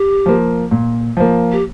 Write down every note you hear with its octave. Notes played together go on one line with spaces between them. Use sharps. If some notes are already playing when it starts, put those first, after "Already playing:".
Already playing: G4
F3 A#3
A#2
F3 A#3
G4